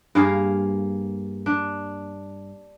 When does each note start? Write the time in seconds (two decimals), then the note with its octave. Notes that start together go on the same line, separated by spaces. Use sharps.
0.15 G2 A#3 G#4 F5
1.46 D4